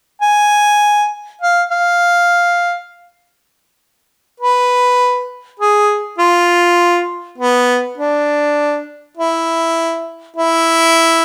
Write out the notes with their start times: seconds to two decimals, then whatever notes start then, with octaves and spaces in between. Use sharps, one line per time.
0.22 G#5
1.42 F5
1.71 F5
4.40 B4
5.60 G#4
6.19 F4
7.38 B3
7.98 D4
9.18 E4
10.37 E4